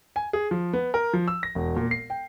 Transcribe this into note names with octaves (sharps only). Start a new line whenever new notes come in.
G#5
G#4
F3
B3
A#4
F3
E6
A#6
E1
A#2
C7
G5